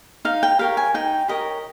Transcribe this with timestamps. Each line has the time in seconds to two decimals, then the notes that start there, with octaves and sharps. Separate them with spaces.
0.25 D#4 F5
0.43 G5
0.59 G4 A#4 C#5 F5
0.77 G#5
0.94 D#4 G5
1.28 G4 A#4 C#5 D#5